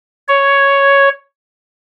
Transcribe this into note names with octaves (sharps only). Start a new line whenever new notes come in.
C#5